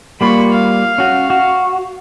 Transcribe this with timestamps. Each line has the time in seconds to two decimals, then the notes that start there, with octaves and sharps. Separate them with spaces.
0.21 G3 A#3 F4 B5 C#6
0.53 F5
0.98 C#4 F#4
1.30 F#4